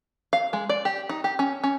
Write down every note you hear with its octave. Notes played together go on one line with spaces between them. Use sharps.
F5
G#3
D5
G4
D#4
G4
C#4
C#4